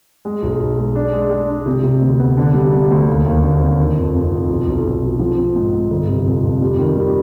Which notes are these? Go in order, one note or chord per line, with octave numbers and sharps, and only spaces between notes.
G#3
B1
B1
G#3
D4
G#3
G#3
D4
C3
C3
D2
B3
D3
G3
G3
D2
D#2
D#2
D3
C4
D#3
F2
F1
F2
B1
B1
B1
B1
F3
C4
G#2
G#2
G1
C3
F2
F2
G3
D#3
G3